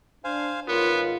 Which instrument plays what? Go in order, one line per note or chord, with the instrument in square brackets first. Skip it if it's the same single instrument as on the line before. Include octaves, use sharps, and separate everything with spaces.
[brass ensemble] D4 [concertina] C5 F5 G#5
[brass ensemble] G#1 G#2 F4 [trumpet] B3 [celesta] A#4 C#5 C6 [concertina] F#5